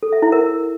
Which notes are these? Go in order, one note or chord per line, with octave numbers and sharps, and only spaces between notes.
A4
E5
E4
A#4